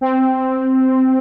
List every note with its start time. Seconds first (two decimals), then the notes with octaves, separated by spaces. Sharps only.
0.01 C4